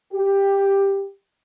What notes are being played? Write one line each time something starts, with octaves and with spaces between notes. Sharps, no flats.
G4